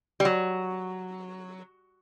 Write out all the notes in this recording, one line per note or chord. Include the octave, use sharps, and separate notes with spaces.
G3
F#3